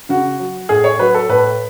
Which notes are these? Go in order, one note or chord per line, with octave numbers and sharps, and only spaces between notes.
C#3 F#4
F#3
A2 G#4
C#5
F#3 B4
A4
A2 B4